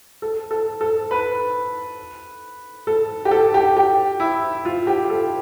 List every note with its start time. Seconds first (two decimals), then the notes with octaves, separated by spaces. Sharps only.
0.22 A4
0.51 A4
0.81 A4
1.11 B4
2.87 A4
3.25 G4
3.31 A4
3.54 G4
3.77 G4
4.20 E4
4.65 F4
4.87 G4
5.09 A4